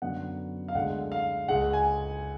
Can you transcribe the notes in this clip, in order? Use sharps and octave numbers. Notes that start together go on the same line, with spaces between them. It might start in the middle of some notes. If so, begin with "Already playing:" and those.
F#2 D3 F#3 B3 F#5
F5
D2 D3 G#3 F#5
F5
C#2 C#3 G#3 F#5
G#5